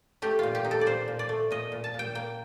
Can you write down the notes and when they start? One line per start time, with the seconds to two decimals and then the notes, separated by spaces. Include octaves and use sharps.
0.22 A3 G4
0.39 A#2 F4
0.55 G4
0.65 D#4
0.71 A4
0.81 D5
0.86 A#2 C5
1.08 A#2
1.19 D5
1.29 A3
1.51 A#2 D#5
1.72 A#2
1.84 A5
1.94 A#2
1.99 G5
2.15 A#3 G5